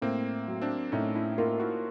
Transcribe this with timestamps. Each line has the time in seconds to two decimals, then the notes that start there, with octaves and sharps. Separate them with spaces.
0.02 A2 A#3 C4
0.48 F#3
0.62 C4 D4
0.92 A2 C#4 D#4
1.14 D4 E4
1.38 A#3 D#4 F4
1.60 E4 F#4